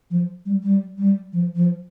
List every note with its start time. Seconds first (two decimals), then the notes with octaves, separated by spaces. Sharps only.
0.10 F3
0.45 G3
0.63 G3
0.98 G3
1.33 F3
1.55 F3